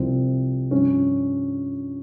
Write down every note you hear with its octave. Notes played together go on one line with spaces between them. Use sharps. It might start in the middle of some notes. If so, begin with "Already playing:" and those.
Already playing: C2 C3 F3 C4
G2 F3 C#4